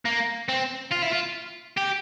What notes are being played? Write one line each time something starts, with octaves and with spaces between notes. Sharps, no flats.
A#3
C4
F4
E4
F4
G4